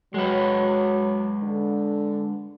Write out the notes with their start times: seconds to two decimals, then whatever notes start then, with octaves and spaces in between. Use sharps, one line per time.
0.14 F#3 G#3 B4
1.43 D3